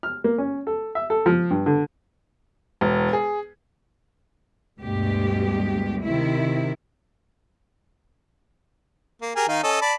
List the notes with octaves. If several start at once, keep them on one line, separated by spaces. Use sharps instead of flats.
F6
A#3
C#4
A4
E5
A4
F3
G2
D3
E1
G#4
D2 G2 B2 G#3 G4
C3 D#3 E4
A#3
G4 G#4 A#4
D#3 D#4 F5
C#4 A4 D#5
D5 A5 B5